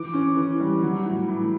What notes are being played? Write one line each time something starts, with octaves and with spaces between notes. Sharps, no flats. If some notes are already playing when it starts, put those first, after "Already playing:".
Already playing: E3 D6
C#4
E3
G3
F#3
A2
A2